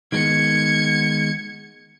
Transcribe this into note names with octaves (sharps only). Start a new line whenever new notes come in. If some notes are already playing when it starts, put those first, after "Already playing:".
D#3 G#3 B3 G#6 C#7